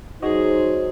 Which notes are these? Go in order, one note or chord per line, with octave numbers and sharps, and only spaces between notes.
F#3 D#4 F#4 G#4 C5 D#5